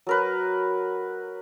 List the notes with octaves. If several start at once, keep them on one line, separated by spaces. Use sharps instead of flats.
F#3 A#4 B4